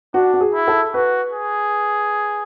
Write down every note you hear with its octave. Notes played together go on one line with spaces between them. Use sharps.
D4 F#4
F#4
G#4
E4
A4
F#4 B4
G#4